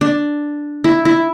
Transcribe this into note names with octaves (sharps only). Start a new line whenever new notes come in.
D4
E4
E4